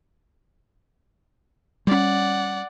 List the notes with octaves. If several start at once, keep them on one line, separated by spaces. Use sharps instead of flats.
G3 C#4 D5 F#5